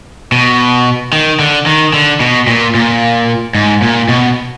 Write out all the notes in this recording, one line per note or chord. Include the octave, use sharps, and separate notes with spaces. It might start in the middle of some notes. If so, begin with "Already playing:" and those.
B2
D#3
D3
D#3
D3
B2
A#2
A#2
G#2
A#2
B2